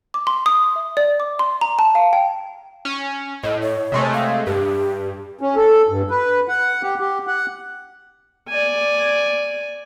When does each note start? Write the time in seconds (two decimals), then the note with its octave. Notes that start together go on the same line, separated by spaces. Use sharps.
0.14 D6
0.27 C6
0.46 D#6
0.76 E5
0.97 D5
1.20 D6
1.39 C6
1.61 A#5
1.79 A5
1.95 F5
2.13 G5
2.85 C#4
3.43 A2 D#5
3.62 C#5
3.92 C3 G#3 A3
4.14 F5
4.47 G2 G4
5.41 C#4
5.56 A4
5.88 G2
6.10 B4
6.48 F#5
6.83 G4
7.00 G4
7.27 F#5
8.49 D5 G#5